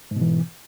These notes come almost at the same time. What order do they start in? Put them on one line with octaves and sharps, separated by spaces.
G#2 B2 E3